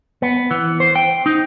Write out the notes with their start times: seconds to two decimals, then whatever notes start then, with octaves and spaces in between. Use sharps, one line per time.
0.22 B3
0.51 E3
0.80 C5
0.96 G5
1.26 D#4